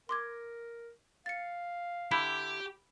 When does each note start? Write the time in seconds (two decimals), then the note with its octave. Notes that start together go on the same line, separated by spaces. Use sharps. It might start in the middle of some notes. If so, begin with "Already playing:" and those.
0.09 A#4 C6 D6 G#6
1.26 F5 A6 C#7
2.11 D3 E4 G4 B5